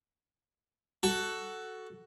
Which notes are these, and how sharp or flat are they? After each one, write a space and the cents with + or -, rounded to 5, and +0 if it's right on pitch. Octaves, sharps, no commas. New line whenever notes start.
F#4 +10 A4 +0